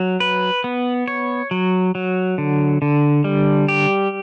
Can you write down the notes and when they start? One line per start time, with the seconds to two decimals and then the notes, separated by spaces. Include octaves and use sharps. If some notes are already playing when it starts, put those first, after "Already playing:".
Already playing: F#3
0.20 B4
0.64 B3
1.08 C#5
1.51 F#3
1.95 F#3
2.38 D3
2.82 D3
3.24 G3
3.68 G4